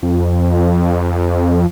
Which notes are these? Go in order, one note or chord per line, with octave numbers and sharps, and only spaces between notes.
F2